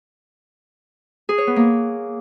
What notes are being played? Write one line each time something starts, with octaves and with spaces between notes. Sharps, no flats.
G#4
C#5
B3
A#3